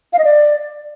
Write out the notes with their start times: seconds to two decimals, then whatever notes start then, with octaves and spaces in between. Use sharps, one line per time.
0.13 F5
0.19 D#5
0.24 D5